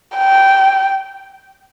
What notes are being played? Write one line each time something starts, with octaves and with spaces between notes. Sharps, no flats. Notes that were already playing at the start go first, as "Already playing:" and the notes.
G5